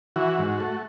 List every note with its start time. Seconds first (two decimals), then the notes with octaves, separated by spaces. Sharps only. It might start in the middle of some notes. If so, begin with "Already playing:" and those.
0.16 E3 F#4
0.39 G#2
0.60 A3